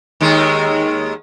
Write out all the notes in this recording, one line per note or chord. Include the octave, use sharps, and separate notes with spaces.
D#2 D#3 G#3